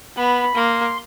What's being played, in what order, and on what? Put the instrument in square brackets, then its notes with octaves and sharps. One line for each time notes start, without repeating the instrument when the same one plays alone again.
[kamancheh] B3 [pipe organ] B5
[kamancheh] A#3 [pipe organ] C6